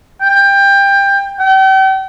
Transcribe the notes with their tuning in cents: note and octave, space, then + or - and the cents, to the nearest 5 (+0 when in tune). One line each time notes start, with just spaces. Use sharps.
G5 +20
G5 -40